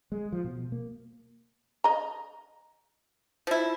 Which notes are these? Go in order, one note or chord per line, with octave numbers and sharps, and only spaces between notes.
G#3
F3
B2
A#3
D#5 A#5
F3 E4